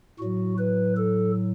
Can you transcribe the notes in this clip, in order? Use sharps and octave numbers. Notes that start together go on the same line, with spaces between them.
A2 F#3 F#4
B4
A4